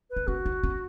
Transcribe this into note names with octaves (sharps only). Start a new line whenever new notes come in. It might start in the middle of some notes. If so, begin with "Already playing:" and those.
B4
D#4
C#4 F#4
D#4
C#4